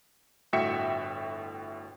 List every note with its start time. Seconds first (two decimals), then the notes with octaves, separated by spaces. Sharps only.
0.53 G1 A2 F#4 E5 G5 C#7